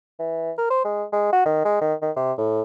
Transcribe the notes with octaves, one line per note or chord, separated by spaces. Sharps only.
E3
A#4
C5
G#3
G#3
F#4
D#3
G#3
D#3
D#3
C3
A2